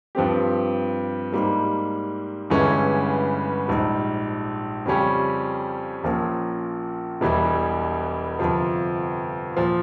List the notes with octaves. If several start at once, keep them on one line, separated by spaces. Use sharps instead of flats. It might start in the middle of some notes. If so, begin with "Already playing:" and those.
G2 F3 C4 G4
G#2 G3 A#3
G1 G2 E3 G#3 C#4
A#1 G#2 G3
F2 C#3 G3 C#4 G4
A#1 A#2 F3 A#3 C#4
E1 E2 E3 G3
G1 F2 C3 F3
A#2 F3